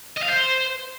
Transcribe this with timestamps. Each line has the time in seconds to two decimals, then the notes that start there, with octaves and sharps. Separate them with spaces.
0.17 D#5
0.22 F5
0.28 C5